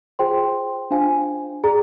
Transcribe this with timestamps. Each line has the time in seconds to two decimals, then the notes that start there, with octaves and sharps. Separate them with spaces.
0.19 F4 G#4 C5 G5 C6
0.91 D4 F4 C5 F5 G#5
1.64 G#4 D5 G5 A#5